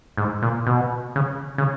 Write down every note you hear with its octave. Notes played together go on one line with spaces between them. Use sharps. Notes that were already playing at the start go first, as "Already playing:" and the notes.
G#2
A#2
B2
C#3
C#3